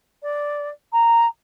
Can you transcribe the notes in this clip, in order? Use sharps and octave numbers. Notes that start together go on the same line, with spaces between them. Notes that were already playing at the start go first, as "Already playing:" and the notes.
D5
A#5